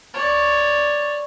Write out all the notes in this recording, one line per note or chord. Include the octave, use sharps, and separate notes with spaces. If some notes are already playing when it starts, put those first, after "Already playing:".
C#5 D5